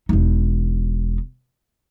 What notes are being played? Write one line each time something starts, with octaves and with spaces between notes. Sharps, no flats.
E1 D#4